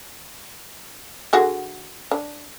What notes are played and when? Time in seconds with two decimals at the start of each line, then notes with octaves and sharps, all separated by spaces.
1.33 D3 F#4 G#4
2.11 D4